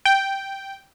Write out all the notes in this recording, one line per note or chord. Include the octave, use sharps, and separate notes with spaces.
G5